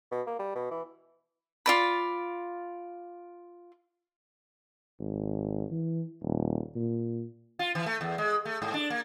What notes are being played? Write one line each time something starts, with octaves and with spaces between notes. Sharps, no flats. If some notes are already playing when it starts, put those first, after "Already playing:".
B2
A#3
G3
B2
E3
F4 D5 B5
G#1
E3
D#1
A#2
F4
E3
A3
E2
G#3
A3
G#2
D4
A#3